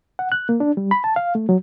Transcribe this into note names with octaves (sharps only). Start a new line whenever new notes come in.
F#5
F#6
A#3
D4
G3
B5
A5
F5
A3
F#3